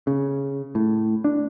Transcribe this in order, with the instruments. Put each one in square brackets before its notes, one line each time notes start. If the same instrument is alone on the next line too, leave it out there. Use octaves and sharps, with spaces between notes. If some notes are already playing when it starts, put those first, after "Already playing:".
[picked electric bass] C#3
A2
D4